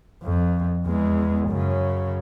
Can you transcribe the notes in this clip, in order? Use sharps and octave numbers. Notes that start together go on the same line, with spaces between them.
F2
E2 G#3
F#2 C#3